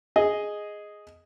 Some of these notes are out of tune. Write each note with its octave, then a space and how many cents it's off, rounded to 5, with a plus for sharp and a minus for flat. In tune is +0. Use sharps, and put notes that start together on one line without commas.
G#4 +0 D#5 +0